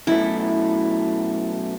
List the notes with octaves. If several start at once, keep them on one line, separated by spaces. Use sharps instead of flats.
F#2 B2 A3 E4